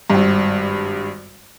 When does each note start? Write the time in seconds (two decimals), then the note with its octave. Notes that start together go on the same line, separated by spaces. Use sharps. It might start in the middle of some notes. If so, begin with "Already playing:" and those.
0.10 G#1 G2